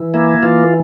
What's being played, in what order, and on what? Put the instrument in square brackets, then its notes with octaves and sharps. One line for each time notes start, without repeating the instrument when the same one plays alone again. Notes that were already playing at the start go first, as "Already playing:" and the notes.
Already playing: [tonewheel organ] E3
A#3 E4
E3 F4